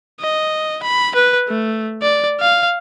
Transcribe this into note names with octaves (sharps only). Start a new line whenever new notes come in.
D#5
B5
B4
A3
D5
F5